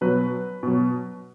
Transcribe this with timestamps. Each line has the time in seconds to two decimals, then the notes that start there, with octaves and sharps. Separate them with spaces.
0.01 B2 F#3 B4
0.63 B2 F#3